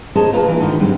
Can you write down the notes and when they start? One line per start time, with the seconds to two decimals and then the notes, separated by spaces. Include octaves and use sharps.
0.15 G#4 C5 C#5 D#5 A5 A#5
0.33 B2 A#3 F4 B4 A#5
0.48 D2 E3
0.60 G#2 D3 D#3 D#4 F#4
0.79 G2 C#3 F#3 G3 A#3 C4